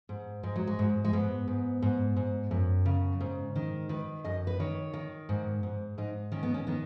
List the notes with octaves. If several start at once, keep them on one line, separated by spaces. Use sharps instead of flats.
G#2
G#2 G#3
F#3
G#3
G#2
G#3
G#2 B3
G#2
G#2
G#2
F#2
C#3
G#2
D#3
D#3 B4
F#2 D#5
B4
D#3 C#5
D#3
G#2
G#2
G#2 D#4
D#3 C#4
B3
C#4
D#3 B3